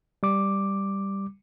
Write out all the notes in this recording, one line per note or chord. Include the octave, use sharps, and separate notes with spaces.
G3 D6